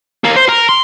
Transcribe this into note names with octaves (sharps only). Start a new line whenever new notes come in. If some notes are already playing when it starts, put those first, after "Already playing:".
D#2 A#3
C5
A#4
C6